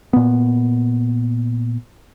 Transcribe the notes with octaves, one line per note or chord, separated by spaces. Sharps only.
A#2 B3